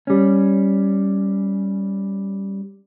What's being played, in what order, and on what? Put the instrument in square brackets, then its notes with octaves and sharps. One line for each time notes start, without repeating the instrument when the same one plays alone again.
[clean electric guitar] G3 C#4